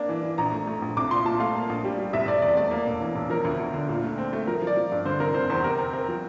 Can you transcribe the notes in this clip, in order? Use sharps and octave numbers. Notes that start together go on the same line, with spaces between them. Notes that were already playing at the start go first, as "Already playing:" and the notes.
Already playing: A#3 D4
E3
E3
A#1 A#5
A3
A3
A#1
C2 D6
A#2 C6
A#2 A5
A3 F5
A#3
A#1
G3
G3
F1 E5
F1 D5
E2 D5
A3 D5
A#3
E1
E3
E1
F3 A#4
D2
D2
D3
A#2
A3
C4
A3
F3 A#4
F3 D5
F3
G2
D3 C5
F1 A#4
F1 C5
E2 C5
C3 A#4
C4
C4 A#4
F3